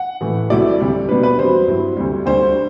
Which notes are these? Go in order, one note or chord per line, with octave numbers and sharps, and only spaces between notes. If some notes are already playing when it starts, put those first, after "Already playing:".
Already playing: F#5
A2 E3 A3
C2 C3 F#3 A3 E4 D5
D2 C3 G3
B2 G3 B3 D4 B4
B4
E2 C3 F#3 C5
G2 F#3 C4 E4
D2 C3 G3
D2 D3 G3 C5